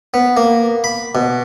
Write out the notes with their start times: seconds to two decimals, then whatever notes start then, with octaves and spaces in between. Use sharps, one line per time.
0.14 B3
0.37 A#3
0.84 B5
1.15 B2